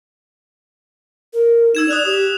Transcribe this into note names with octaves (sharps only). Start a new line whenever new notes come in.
A#4
D#4 E6 G#6 E7
D5 D#6 F#6 F7
G4 D#6